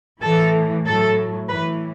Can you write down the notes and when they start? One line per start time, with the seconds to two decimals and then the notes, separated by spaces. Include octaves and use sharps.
0.22 A2 E3 A4
0.85 A2 F#3 A4
1.48 A2 E3 B4